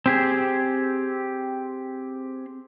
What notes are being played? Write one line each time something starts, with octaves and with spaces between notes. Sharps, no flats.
C4 G4 G#4